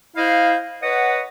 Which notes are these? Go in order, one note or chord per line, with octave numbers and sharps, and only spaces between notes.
E4 C5 D#5 F5
B4 C#5 D#5 F#5